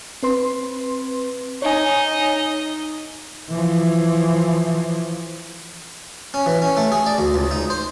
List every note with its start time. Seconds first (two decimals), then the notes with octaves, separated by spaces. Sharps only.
0.23 C4 B4 C6
1.62 D#4 C#5 D#5 G#5
3.50 E3 F3
6.34 C#4
6.46 E3
6.62 C#4
6.77 A3
6.92 G#4
7.06 D5
7.18 D2
7.34 C#2
7.51 D#4
7.70 C5